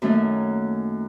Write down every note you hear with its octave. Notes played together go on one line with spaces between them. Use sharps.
F#2 D#3 A3 A#3 C#4